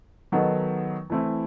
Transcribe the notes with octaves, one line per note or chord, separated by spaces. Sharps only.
D#3 F#3 B3 D#4 A4
E3 A3 C4 E4